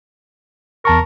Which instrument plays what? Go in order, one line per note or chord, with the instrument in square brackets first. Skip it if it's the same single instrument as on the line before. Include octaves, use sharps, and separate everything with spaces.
[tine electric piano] E2 A5 C#6 [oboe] A#4